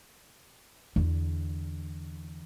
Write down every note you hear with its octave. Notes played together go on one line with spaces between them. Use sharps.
E2 D3